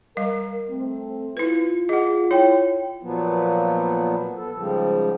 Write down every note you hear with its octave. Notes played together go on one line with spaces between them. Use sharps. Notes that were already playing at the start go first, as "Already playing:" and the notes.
G3 A#4 F5
A3 C4
E4 F4 B4
G#4 D#5 F#5
E4 C#5 G5
A#2 F3 F#3 B3
B3 A4
G#2 C#3 F3 G3